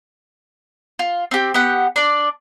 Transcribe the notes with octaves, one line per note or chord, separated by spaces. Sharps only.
F4
C4 G4
B3 G4 F#5
D4 D5